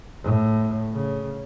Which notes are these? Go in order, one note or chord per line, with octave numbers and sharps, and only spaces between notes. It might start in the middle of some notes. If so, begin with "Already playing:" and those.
A2
C#3